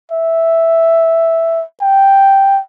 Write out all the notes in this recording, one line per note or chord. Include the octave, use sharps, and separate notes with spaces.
E5
G5